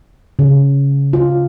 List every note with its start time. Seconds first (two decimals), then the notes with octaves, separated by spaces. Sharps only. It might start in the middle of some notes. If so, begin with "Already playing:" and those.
0.39 C#3
1.13 F4